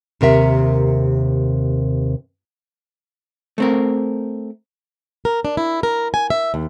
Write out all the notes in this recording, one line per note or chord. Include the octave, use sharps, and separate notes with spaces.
D#2 C3 A#4 E5
A3 C4 A#4
A#4
D4
E4
A#4
G#5
E5
D#2